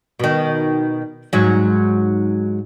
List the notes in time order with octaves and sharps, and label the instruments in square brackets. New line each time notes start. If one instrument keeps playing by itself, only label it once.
[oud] B2 D#3
G#2 F#3